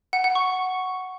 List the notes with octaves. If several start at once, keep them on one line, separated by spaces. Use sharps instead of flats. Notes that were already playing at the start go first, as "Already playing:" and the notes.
F#5
F#5
C#6